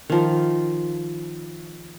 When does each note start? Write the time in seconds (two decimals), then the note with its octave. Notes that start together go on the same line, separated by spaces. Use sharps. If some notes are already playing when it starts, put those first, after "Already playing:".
0.10 D#3 F3